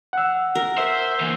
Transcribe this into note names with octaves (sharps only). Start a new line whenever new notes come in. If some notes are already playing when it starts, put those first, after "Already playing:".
F#5 E6
A#4
C5 E5
E3 A#3